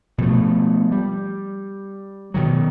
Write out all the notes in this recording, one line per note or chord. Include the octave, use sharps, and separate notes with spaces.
B2 F3 A3
G3
B2 D#3 F#3